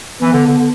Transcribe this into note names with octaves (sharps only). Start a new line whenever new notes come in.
E3 B3
D3
D3
D3